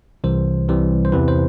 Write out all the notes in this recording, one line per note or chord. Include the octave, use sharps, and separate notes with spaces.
C2 C3 E3 G3 C5
C2 C3 E3 G3
C5
E2 C3 E3 B4
C5